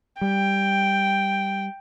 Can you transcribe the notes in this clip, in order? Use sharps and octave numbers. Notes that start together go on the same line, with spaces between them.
G3 G5